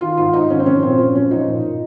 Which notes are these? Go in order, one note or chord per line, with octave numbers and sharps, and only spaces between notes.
D#3 F4
G#2 F4
G#2 D#4
D#3 C#4
C4
F3 C#4
A#2 C4
A#2 C#4
F3 C#4
F3 D#4
A#2
A#2